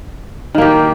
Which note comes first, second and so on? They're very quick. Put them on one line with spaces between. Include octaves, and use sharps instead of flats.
D#3 A#3 G4